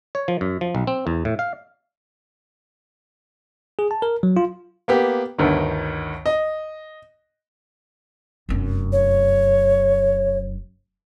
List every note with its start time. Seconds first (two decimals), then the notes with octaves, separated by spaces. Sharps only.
0.15 C#5
0.28 F3
0.41 F#2
0.61 F3
0.75 B1
0.87 C4
1.07 E2
1.25 A2
1.39 F5
3.79 G#4
3.91 A5
4.02 A#4
4.23 F#3
4.37 F4
4.88 A#3 B3 G4
5.38 G1 D2 D#3
6.26 D#5
8.49 F1 F#2
8.92 C#5